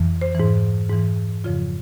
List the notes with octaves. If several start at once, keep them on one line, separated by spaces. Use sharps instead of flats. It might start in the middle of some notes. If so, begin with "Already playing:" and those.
Already playing: F2 E3
C5
G#2 E3
G#2 E3
F2 C#3 F3 F4